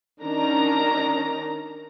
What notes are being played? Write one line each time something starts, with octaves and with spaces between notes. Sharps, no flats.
D#3 C#4 D4 A#5